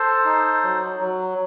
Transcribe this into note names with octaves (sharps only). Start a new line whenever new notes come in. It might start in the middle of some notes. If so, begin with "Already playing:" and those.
Already playing: A4 C5
D#4
F#3
F#3